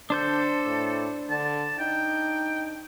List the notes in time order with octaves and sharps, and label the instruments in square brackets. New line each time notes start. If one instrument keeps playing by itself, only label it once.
[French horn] D3 [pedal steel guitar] D4 C5 G6 [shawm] A4
[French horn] A2
[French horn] D3 [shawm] A5
[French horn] D#4 [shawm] G5